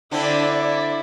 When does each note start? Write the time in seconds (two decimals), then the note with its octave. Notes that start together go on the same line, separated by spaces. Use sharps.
0.11 D3 C4 D4 E4 D5